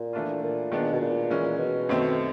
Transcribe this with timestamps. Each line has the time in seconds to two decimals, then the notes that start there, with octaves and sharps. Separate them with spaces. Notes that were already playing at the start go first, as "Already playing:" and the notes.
Already playing: A#2
0.13 E3 A3 D4 F4
0.43 A#2
0.72 D#3 G#3 B3 D4
0.92 B2
1.01 A#2
1.31 E3 G#3 C#4
1.59 B2
1.89 F#2 D#3 F#3 A3 C4